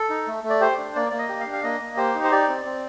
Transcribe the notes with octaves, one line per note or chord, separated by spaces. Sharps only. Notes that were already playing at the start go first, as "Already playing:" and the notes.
Already playing: A4
D#4
A3
A3
D5
G4 C5
D4
A#3 D5
A#3 D5
D#5
G4
F5
D4
F5
A#3 D#5
A#3
G4 C5
D#4
C5
G4 D5
C4
C4